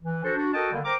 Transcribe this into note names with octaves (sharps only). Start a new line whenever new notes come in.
E3
D4 F#4 A4 C5
D4 F#4
F#4 A4 A#4 D#5 G5 A5
D3 D#3 G3 A#3
A#4 C5 G5 A#5 D6